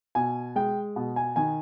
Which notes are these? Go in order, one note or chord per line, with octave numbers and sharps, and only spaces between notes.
B2 G#5
G#3 G5
B2
G#5
D#3 G#5